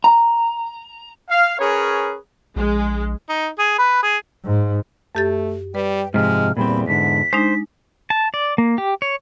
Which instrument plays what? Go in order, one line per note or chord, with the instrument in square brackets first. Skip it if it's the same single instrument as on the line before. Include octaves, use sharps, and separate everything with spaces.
[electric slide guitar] A#5
[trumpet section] F5
C#4 G#4 A#4 B4 C#5
[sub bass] A#1 [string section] G#3
[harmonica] D#4
G#4
B4
G#4
[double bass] G#2
[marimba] F#2 G4 A6 [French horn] A3
[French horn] G3 [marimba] B4 [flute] G5
[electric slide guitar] G#2 C3 F3 [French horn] G#3 [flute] F6
[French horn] E2 [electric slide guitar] A#2 G3 C4 [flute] B5
[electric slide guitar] G#2 D3 [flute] B6
[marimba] G#3 D4 D#4 [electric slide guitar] C5
[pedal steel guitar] A5
D5
A#3
G4
C#5